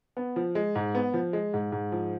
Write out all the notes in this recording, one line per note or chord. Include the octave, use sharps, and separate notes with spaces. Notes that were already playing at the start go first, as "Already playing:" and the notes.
B3
F3
G#3
G#2
B3
F3
G#3
G#2
G#2
F3